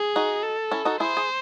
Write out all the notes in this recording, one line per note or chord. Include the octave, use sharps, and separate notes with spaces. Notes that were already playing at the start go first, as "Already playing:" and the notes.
Already playing: G#4
D#4 F#4
A4
C#4 E4
D#4 F#4
E4 G#4 C5
G#4